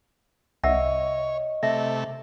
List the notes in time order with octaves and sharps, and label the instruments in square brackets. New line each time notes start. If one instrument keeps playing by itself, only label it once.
[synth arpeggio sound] C2 [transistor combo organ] C#5 [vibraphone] D#5 [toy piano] E5 F#5 E6
[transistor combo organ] C3 A3 A4 [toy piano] E5